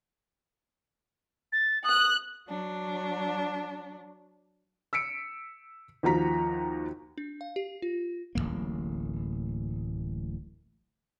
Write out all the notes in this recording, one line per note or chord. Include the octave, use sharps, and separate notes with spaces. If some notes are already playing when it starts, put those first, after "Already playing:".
A6
D#6 F#6
F#3 D4
E6 B6 C#7 D7
D#2 F3 F#4 A#5 B6
D4
F5
G4
F4
D1 A1 F#2 A#3